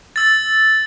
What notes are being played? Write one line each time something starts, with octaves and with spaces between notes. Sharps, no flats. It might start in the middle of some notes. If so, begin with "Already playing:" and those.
E6 A6